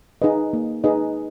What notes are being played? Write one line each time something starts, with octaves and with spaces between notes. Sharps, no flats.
D#4 G#4 B4 D#5
A#3
D#4 G#4 B4 D#5